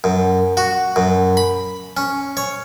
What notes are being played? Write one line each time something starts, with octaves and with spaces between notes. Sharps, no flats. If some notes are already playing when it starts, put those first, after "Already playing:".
F#2
F#4
F#2
B5
C#4
C#5